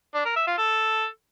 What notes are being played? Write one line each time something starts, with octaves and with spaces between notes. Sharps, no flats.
D4
A#4
E5
F4
A4